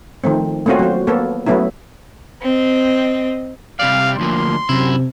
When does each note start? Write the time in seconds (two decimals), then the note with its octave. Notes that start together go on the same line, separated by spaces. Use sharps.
0.24 D#3 F3 A3 C4
0.66 A3 A#3 C4 C#4 F4 F#4
0.79 F#3 C5
1.07 A#3 B3 A4 C#5
1.46 F#3 A3 B3 C#4 E4
2.42 C4 D#5
3.79 C3 G3 D5 F5
4.19 D2 F3 A#3 C6
4.69 F#2 C3 E4